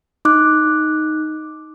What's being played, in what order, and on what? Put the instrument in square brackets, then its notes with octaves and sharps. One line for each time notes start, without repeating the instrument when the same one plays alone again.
[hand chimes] D#4 D6 F#6